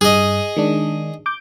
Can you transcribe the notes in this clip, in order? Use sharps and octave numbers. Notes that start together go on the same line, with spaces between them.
G2 G#4 D#5
D#3 G#3 D4
D6 G6